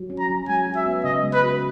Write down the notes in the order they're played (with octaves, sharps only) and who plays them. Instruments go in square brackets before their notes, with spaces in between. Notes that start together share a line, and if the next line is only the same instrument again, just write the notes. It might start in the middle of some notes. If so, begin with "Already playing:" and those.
Already playing: [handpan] F#3
C#4
[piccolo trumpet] A#5
[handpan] F#3
[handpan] G#3 [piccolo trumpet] G#5
[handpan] F#4
[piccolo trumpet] E5
[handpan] B3
[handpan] C#3 [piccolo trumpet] D#5
[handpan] G#3
[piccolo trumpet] B4
[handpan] F#4